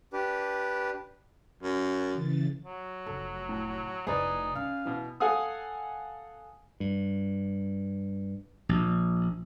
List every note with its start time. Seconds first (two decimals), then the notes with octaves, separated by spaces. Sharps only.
0.13 D4 G4 B4
1.63 F#2
2.11 C#3 E3 A6
2.65 F#3
3.06 F1 A4
3.49 A2
4.07 F1 D#4 E4 G#4 B4 D5
4.55 C#4 F5
4.85 B2 E3
5.20 A4 F5 F#5 G#5 D#6
6.80 G2
8.69 A#1